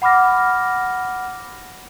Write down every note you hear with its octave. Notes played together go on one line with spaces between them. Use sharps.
F#5 B5 D6 F6 A#6